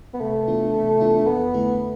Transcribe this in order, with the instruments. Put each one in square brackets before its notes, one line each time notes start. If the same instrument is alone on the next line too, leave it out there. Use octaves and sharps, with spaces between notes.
[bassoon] B3
[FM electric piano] C3 [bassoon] A3
[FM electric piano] E3 B3 D4 F4
C3
E3 B3 D4 F4
[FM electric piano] F2 [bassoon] B3
[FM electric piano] D3 A3 E4 A4